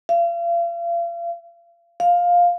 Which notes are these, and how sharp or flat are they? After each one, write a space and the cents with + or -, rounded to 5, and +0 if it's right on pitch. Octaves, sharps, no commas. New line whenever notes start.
F5 -40
F5 +10